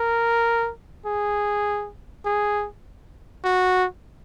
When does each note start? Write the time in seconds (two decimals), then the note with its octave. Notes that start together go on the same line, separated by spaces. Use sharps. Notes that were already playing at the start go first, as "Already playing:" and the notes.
Already playing: A#4
1.06 G#4
2.25 G#4
3.44 F#4